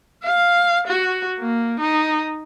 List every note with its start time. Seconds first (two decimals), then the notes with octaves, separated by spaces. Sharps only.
0.23 F5
0.87 F#4
1.39 A#3
1.80 D#4